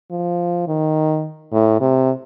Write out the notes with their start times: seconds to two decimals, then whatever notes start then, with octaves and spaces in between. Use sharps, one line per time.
0.11 F3
0.68 D#3
1.53 A2
1.81 C3